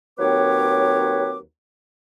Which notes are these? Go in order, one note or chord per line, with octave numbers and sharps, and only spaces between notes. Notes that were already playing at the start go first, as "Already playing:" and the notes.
D#2 F#3 C4 B4 C#5 D6